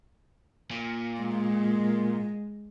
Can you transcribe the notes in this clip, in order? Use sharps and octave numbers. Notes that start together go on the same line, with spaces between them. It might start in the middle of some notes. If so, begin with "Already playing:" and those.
A#2
G#3